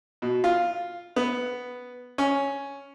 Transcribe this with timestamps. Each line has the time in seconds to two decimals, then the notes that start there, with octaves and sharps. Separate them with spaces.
0.22 B2
0.44 F4
1.16 B3
2.18 C#4